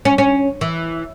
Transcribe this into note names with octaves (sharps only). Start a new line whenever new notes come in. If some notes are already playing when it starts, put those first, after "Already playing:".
C#4
C#4
E3